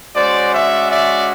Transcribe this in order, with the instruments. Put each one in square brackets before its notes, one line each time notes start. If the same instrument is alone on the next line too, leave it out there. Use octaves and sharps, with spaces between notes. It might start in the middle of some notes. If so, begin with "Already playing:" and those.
[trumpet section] G#3 C#4 F#4 C5 D5
D5 E5
D5 E5